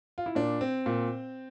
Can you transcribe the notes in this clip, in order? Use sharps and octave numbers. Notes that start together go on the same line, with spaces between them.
F4
E4
A#2 D4
C4
A#2